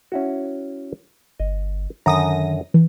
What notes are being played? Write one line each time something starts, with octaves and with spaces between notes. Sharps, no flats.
C#4 E4 F#4
G1 D#5
F#2 D3 D#3 A#5 D#6 A#6
E3